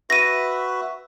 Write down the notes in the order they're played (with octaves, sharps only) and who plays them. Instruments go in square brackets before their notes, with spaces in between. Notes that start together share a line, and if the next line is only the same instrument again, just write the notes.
[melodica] F#4 B4 E5 [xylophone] A#6 D#7